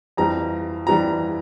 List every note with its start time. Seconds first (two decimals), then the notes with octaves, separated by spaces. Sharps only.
0.17 F2 E3 G3 A#5
0.87 F2 E3 G3 A#5